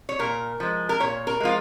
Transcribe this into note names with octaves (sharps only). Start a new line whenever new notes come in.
C#5
A#2 A#4
F3 G#3
A#4
A#2 C#5
A#4
F3 G#3 F4